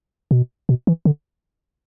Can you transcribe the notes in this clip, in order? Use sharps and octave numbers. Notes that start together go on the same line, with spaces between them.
B2
B2
E3
D3